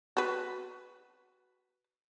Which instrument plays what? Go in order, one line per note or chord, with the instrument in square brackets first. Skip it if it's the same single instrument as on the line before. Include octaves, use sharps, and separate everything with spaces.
[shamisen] F#4 B4